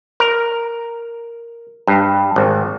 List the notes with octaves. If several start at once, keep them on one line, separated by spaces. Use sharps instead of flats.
A#4
G2
G#1